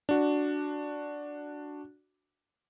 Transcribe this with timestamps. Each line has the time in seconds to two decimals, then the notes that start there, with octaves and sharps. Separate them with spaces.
0.09 D4 F#4